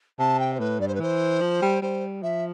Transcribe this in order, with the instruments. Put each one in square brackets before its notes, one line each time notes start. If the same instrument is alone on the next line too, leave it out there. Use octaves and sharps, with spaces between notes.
[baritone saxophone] C3 [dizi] A5
[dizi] G5
C5
[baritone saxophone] A2 [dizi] B4
[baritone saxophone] G2 [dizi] D5
[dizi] C5
B4
[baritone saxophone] E3 [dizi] C5
[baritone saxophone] F3
G3
[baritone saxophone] G3 [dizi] C5
[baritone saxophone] F3 [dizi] E5